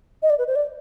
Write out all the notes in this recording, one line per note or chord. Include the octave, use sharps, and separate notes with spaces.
D#5
D5
B4
C5
D5